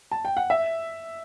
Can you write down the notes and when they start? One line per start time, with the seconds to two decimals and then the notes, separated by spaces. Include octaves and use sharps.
0.11 A5
0.25 G5
0.37 F#5
0.50 E5